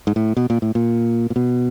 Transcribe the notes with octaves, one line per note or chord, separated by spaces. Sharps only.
G#2
A2
B2
A#2
A2
A#2
A#2
B2